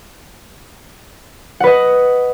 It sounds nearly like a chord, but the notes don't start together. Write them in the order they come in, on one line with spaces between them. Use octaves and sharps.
F#5 B4 D#5